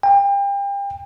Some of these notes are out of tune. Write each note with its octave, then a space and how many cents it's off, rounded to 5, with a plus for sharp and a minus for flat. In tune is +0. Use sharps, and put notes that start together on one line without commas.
G5 +35